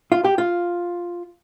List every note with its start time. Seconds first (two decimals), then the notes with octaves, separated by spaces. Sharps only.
0.12 F4
0.25 G4
0.38 F4